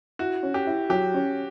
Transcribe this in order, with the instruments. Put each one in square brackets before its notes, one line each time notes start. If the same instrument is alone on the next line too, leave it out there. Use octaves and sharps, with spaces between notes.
[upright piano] E4 [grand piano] F#4
[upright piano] C#4
[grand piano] G4
[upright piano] E4
[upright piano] F#3 [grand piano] G4
[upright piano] C#4